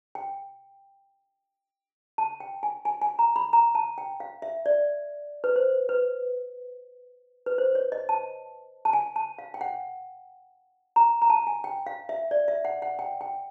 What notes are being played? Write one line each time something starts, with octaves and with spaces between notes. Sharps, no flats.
G5
A5
G5
G#5
G#5
G#5
A#5
B5
A#5
A5
G5
F5
E5
D5
B4
C5
B4
B4
C5
C#5
D#5
A5
A5
G#5
A5
F5
G5
F#5
A#5
A#5
A5
G#5
G5
F5
E5
D5
E5
F#5
F#5
G5
G5